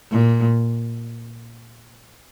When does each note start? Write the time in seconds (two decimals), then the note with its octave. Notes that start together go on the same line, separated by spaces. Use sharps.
0.11 A#2